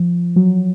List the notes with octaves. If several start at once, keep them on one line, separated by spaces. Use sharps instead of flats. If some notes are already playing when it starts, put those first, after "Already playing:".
Already playing: F3
F#3